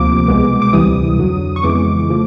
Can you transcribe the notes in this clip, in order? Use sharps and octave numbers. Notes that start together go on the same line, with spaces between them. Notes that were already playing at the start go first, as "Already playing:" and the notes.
Already playing: D2 C3 F3 A#3 D6
C2 B2 G#3 B3
D6
D2 C3 E3 G3 D#6
F2 D3 F#3
C#6
F2 C#3 E3 G#3 B3 D6
C#3 F3 A3